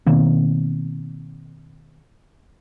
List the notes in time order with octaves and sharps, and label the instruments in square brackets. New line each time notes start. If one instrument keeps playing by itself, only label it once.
[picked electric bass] B2 D#3 A#3 C4